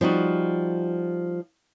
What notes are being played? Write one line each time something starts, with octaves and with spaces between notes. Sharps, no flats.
F3 G3 D#4 F#4